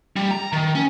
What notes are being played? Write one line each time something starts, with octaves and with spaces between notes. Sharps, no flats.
G3
A#5
D#3
C#4